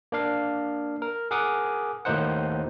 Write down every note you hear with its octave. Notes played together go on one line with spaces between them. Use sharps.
A#3 D4 F5
A#4
G#4 A#4 F#5 D6 D#6
D#2 A2 A#3 D#4 C5 F#5